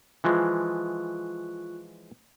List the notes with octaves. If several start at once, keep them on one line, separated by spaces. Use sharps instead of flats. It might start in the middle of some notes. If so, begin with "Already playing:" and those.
E3 F3 G#3 F4 C#6 F#6